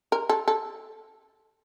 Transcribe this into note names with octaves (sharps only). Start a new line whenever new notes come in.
A#4
A4
A4